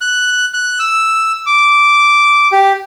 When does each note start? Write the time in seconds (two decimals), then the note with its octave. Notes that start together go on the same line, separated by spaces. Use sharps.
0.01 F#6
0.54 F#6
0.79 E6
1.46 D6
2.52 G4